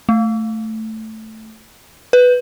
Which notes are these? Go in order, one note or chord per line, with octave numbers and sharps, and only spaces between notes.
A3
B4